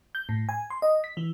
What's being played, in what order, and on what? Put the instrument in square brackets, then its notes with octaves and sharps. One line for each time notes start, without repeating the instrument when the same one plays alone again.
[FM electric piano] G6
A2
G#5
C6
D#5
B6
E3